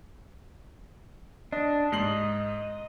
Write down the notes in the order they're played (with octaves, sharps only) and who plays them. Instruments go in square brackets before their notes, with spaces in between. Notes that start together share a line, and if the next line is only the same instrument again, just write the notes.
[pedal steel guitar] D4 [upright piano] D#5
[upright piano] G#2 C7 F#7 [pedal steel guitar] D#5